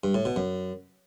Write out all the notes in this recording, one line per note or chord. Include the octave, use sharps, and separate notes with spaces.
G2
A2
B2
F#2